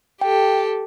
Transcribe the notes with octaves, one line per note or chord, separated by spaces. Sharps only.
G4 A4 G5